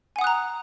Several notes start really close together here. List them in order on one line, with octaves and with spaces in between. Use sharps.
G#5 F#5 D#6 F#6 A#5